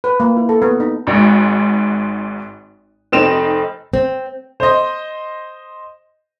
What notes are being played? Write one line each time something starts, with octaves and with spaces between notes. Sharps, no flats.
B4
A#3
E4
A4
B3
D#4
G#1 G#2
F1 C4 D#4 E7
C4
C5 D#5